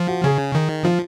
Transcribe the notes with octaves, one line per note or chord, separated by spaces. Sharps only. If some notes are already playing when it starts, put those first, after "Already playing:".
Already playing: F3
F#4
C#3 G#4
D#3
F3 F4